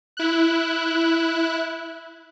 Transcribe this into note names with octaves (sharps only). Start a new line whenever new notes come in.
E4 F#6